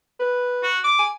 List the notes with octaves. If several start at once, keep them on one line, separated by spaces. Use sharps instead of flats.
B4
F#4
D6
G#5